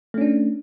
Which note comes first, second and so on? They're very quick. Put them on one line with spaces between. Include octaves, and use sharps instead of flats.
A3 C#4 D4